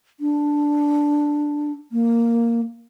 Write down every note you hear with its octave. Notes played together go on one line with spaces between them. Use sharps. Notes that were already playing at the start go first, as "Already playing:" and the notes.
D4
A#3